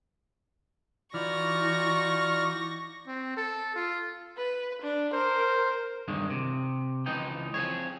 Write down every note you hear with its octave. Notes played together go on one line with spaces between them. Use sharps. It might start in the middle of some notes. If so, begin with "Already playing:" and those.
E3 D#4 F4 F#4 D5 C#6 F6 A#6
C4
A4
F4
B4
D4
A#4 C5
E2 G2 D#3 G#3
C3
C#2 E3 F3 D#4 G5
F3 C4 G#4 C#5